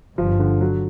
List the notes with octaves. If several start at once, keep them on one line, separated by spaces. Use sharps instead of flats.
G1 G2 F3
D3
F#3